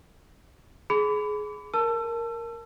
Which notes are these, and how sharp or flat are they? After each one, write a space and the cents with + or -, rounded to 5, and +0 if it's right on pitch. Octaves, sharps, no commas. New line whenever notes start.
G#4 +20 B5 +25
A#4 +0 A5 +0 E6 +35